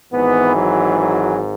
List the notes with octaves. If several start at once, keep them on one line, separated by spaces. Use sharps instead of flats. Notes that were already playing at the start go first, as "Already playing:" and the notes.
G#1 G#2 E3 B3
F#3
F#3